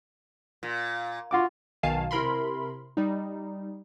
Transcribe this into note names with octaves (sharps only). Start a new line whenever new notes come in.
A#2
F4 F#4 D6
B1 B2 D#3 F5 G#5 A5
C3 E4 A#4 B5 C6
G3 D#4